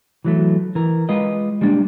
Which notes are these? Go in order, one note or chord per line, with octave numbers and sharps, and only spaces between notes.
E3 F#3 A3
E3 A#4
G#3 F4 B4 D#5
G3 G#3 A#3 D4